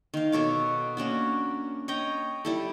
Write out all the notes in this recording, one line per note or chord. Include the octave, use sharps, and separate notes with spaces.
D#3 F5
B2 A4 C#5 D6
A#3 C#4 D4 F#4
C#5 D#5 G5 A#5
G3 E4 A4